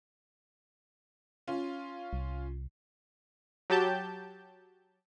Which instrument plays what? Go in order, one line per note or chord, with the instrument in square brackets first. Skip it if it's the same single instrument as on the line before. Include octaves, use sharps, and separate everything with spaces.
[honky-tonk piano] C#4 F4
[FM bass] C2
[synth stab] F#3 G4 A5 G6